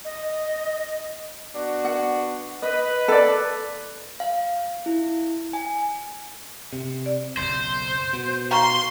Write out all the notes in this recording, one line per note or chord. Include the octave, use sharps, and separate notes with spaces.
D#5
B3 D4 F#4
F#5
B4 D#5
A4 D5
F5
E4
G#5
C3
D5
F#1 B1 C5
B2
F5 A#5 C6 C#6